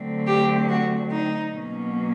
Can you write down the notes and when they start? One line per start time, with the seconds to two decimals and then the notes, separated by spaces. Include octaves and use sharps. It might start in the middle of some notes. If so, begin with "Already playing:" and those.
Already playing: D3 F#3 A3 C4
0.26 G4
0.69 F#4
1.11 D#4
1.55 B2 F#3 A#3 C#4